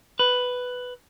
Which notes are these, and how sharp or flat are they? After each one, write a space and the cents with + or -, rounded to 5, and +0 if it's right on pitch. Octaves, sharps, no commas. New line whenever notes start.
B4 +5